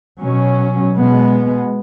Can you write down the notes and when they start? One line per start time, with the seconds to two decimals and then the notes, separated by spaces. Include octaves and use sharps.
0.21 B2 F#3 C#4
0.95 B2 G#3 B3